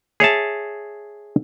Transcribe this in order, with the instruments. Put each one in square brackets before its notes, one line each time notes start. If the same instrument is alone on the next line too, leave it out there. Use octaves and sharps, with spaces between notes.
[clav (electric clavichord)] G#4 C#5 E5 A5